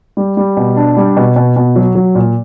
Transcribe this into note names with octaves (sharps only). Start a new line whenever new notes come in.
G3
G3
B2
D4
G3
B2
B2
B2
F#3
F#3
A#2